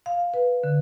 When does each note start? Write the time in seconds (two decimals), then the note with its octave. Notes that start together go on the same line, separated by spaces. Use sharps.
0.06 F5
0.34 B4
0.64 D3